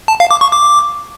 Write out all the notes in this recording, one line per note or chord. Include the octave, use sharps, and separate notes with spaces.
A5
F5
D6
C#6
D6